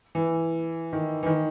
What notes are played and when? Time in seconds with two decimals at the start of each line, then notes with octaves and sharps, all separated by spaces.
0.15 E3
0.93 D#3
1.23 E3
1.26 D#3